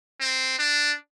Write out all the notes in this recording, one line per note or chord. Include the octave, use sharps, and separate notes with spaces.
C4
D4